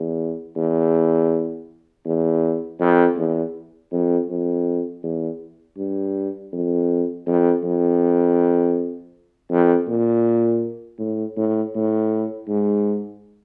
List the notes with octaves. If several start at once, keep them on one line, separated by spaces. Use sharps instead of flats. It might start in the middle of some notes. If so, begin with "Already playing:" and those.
Already playing: E2
E2
E2
F2
E2
F2
F2
E2
G2
F2
F2
F2
F2
A#2
A2
A2
A2
G#2